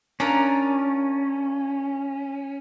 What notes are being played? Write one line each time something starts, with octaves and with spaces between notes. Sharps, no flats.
C#4 D4 F4 A#4